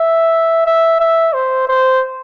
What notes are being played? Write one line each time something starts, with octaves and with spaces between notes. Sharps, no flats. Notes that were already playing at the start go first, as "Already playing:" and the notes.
Already playing: E5
E5
E5
C5
C5